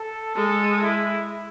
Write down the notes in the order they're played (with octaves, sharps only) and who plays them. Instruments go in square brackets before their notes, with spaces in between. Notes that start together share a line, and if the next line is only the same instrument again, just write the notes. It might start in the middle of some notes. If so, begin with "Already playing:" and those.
Already playing: [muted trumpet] A4
[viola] G#3 [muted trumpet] A4
[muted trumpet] E4